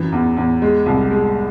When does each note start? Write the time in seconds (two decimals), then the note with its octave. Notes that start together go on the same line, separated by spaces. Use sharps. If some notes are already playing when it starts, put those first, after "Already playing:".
Already playing: F#2 E3
0.12 E2
0.37 E2
0.62 G#3
0.86 C2
1.11 G#3